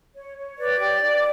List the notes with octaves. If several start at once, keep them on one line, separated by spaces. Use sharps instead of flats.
C#5
C#5
B4 D5
G4
D4